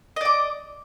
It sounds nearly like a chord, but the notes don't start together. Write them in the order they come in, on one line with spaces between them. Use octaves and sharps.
D#5 D5 D6